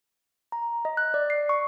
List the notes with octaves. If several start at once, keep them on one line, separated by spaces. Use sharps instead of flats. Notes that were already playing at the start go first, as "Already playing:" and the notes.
A#5
D#5
F#6
D5
C7
C#6